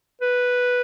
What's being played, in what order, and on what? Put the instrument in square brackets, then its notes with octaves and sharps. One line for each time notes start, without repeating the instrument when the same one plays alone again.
[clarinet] B4